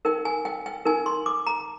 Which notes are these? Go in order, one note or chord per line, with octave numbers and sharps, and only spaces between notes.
D#4 A#4 G5
G#5
G5
G5
D#4 A#4 G#5
C6
D6
A#5